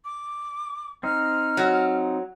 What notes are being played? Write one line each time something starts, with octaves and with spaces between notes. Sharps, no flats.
D6
C4 D#4 F6
F#3